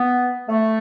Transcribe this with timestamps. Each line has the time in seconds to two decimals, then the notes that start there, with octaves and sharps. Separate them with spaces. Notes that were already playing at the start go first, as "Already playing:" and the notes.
Already playing: B3
0.49 A3